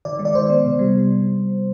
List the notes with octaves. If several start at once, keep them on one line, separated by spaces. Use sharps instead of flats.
D#3 D5
G#3
D5
D#3 C5
B3
C3
G3